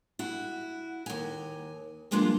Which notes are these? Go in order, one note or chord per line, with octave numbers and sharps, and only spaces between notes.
E4 F#4
D#2 G#5
F3 G3 G#3 A#3 D4 F4